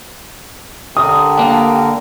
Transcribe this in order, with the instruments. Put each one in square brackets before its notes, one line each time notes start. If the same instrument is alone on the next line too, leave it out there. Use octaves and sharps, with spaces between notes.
[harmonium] D3 A#4 [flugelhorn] G4 [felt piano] D#6
[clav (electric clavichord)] A#3 D4